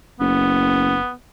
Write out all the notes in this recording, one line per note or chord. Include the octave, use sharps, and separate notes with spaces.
F#1 B3